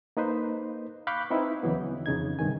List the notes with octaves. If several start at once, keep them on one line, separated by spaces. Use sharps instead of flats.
A#3 D#4 B4 C5
F5 B5 C#6 D6 F#6 G6
C4 D#4 E4 B4
D2 C#3 E3 F#3 B3
F2 C#3 D#4 G#6
G2 C3 D#3 G#5